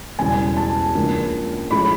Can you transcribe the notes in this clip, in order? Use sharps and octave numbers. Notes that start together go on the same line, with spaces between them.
E1 E2 C#3 E3 G3 G#5
A5
C#2 C#3 F3 A#3 D4
A2 F3 G#3 C#4 B5